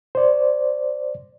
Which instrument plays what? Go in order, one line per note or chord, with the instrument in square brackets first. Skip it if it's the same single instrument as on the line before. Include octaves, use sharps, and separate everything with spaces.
[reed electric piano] C5 D5